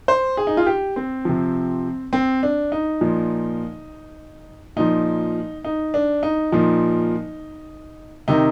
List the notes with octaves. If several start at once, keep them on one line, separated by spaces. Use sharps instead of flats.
C5
G#4
D#4
F4
G4
C4
C3 F3
C4
D4
D#4
A#2 F3
A#2 F3 D#4
D#4
D4
D#4
A#2 F3 D#4
C3 D#3 D#4